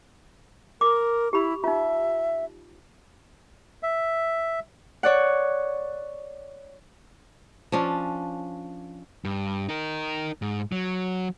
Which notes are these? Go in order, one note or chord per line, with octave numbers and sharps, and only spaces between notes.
A#4 D6
E4 G4 B5
D#4 F4 E5
E5
C#5 D5 F#5
F3 C#4 D4
G2
D#4 A#4
G#2
F#3